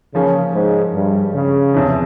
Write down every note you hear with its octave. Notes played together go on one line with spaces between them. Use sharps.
C#3 F3 A#3 C#4
G#2
G2
C#3
E2 C3 F3